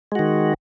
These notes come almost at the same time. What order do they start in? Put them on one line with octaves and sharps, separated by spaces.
G#3 F#4 D#3